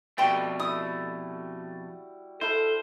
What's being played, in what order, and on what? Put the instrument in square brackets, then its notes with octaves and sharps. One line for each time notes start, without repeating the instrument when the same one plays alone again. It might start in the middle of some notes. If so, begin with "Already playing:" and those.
[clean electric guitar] F2 B2 A3 [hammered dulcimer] G3 F#4 [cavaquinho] G5 C6
[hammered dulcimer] E4 [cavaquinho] D#6
[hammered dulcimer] E4 F5 B5 [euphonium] A4 [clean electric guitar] C5